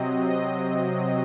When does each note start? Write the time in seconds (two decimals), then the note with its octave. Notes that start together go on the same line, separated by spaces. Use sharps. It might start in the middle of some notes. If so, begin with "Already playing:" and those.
Already playing: C3 F#3 C4 D#5
0.30 D#5